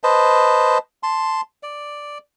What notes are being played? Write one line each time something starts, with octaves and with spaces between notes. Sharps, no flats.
B4 C5 D#5 A5
A5 C6
D5